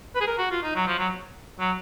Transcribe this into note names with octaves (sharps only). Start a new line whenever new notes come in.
B4
G#4
A#4
F#4
F4
D#4
F#3
F3
F#3
F#3